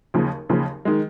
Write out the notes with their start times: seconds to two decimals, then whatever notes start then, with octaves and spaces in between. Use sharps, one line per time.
0.14 D#2 C#3 F3
0.49 D#2 C#3 F3
0.85 D#3 G#3